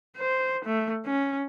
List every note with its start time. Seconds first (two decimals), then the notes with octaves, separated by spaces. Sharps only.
0.17 C5
0.65 A3
1.06 C#4